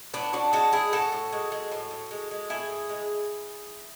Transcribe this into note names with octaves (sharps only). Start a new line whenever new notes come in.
A2 B3 D4
A2 D4 F#4
G#3 F#4 A4
G#3 E4 G#4
A2 F#4 A4
A2
G#3
G#3
A2
A2
G#3
G#3
A2 E4 G#4
A2
G#3